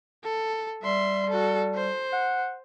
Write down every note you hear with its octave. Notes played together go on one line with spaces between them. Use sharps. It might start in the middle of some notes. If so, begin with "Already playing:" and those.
A4
G3 E5 C6
F#4 A4
C5
F#5